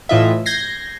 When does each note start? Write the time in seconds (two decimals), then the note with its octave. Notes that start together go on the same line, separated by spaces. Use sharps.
0.09 A2 E3 F4 D#5 E5
0.46 G6 G#6 A#6 C7